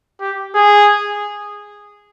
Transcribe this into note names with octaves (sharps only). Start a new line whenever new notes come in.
G4
G#4